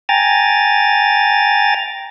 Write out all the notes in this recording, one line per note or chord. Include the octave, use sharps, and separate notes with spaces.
G5 G#5 A#5 A6